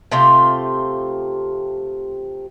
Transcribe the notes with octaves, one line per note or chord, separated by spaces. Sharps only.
C3 A3 F4 G4